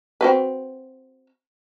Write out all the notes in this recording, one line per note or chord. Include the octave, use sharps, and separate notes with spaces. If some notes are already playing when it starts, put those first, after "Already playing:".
C4 F#4 B4